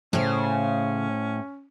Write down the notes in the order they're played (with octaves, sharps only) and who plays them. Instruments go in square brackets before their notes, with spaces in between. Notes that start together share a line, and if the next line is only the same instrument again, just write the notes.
[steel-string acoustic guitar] A2 C5 [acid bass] C#3 [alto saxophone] C#4